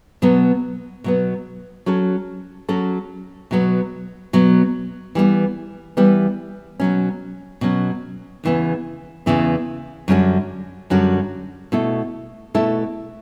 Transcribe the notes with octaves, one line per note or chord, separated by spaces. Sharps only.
B2 F#3 B3
B2 F#3 B3
F#3 C#4 F#4 A4
F#3 C#4 F#4 A4
B2 F#3 B3
B2 F#3 B3
E3 G3 B3
E3 G3 B3
B2 F#3 C#4
B2 F#3 C#4
E2 C#3 E3 B3
E2 C#3 E3 B3
F#2 D3 G3 C#4 F#4
F#2 D3 G3 C#4 F#4
B2 A3 E4 A4
B2 A3 E4 A4